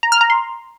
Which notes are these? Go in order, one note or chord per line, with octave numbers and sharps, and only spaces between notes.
A#5
F6
A#5
C6